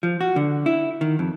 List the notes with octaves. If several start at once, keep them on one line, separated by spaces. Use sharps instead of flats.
F3
F#4
D3
E4
D#3
F2